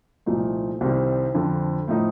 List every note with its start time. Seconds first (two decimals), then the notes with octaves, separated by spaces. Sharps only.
0.26 C2 A#2 F3 A3 D#4
0.81 C2 C3 D#3 G3 C4
1.35 F2 D3 F3
1.88 A2 F3 A3 D#4